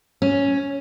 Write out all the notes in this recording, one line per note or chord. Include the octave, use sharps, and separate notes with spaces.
C#4